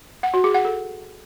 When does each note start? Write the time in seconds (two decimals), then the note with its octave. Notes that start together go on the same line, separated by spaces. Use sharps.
0.23 F#5
0.34 F#4
0.44 G#4
0.54 F#5
0.65 A4